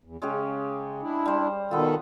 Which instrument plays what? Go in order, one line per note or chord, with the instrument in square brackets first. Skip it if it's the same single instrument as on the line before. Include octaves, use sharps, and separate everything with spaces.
[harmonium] E2
[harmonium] C#3 [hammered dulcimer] G#3 C#4 G4
[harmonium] D4 E4
[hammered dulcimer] G3 C5
[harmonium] B2 D#3 A4 [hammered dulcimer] B3 F4